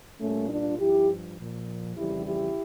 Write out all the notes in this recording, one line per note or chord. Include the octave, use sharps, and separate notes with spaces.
A#2 G3 A3 C#4
D4 F4
G2 F3 E4 G4
A#2 F3
F2 C#3 E3 G3 E4 G4
E4 G4